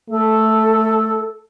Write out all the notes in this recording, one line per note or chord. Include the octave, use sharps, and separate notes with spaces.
A3 A4